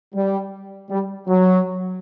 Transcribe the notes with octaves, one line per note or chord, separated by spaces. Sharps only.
G3
G3
F#3